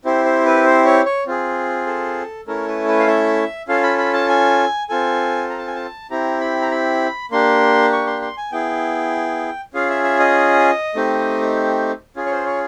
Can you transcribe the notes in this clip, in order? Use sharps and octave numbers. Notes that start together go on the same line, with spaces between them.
C4 E4 G4 C5
C5
B4
C5
C#5
C#5
C4 F4 G#4
A4
A3 C#4 E4 A4 A#4
B4
B4
F5
E5
C#4 F4 A4 F5
B5
B5
A5
G#5
C4 F4 A4 G#5
A#5
A5
G#5
A5
C4 E4 G4 A#5
B5
A#5
B5
A#3 D4 G4 C6
C#6
C6
C6
G#5
B3 E4 G#4 G5
C#4 F4 G#4 F5
E5
E5
D#5
A3 C4 D#4 G4
C#4 F4 G#4
C#5
C5
C#5